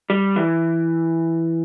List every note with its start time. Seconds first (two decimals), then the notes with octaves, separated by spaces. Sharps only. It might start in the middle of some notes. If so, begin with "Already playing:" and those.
0.10 G3
0.36 E3